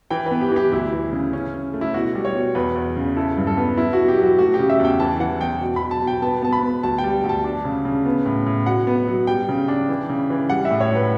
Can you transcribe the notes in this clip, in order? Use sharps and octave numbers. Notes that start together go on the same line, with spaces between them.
E3 G5
B4
B3
G4
E3 G4
D2 E4
E3
C#3
C#4
C#4
A3
E4
B2 F#4
G3
C#5
B2
E2 B4
E2
C#3
E4 A4
G2
A4
B3
B3 E4
B2 F#4
G4
F#3 F#4
A3 F#4
G4
C#3
E5
E2
G5
E3 A5
E3 F#5
E2 G5
B2
B5
B2
A5
B2
G5
B3 A5
B3 A5
B5
B3
D2 A5
G5
G3
D2
A5
D4
C#3
C#3
B3
A2
A2
B2 F#5
B3
F#3
G3 G5
C#3
D4
E3
C#3
E3
G3 F#5
E5
A2
C#5
A2 B4